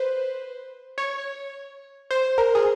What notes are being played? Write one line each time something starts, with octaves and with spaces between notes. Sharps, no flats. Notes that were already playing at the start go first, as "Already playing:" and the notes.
Already playing: B4 C5
C#5
C5
A#4
G#4